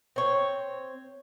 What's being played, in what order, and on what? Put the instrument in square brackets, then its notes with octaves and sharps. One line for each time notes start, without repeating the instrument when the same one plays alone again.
[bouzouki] C4 C#5